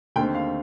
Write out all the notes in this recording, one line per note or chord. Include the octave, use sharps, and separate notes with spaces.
D#2 D3 A3 C4 G5
F5